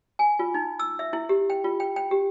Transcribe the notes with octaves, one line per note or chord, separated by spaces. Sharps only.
G#5
F4
D#4
E6
E5
E4
G4
G5
F4
G5
G5
G4